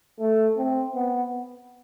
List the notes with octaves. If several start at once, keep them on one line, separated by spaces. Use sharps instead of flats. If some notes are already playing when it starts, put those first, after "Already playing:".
A3
C4
B3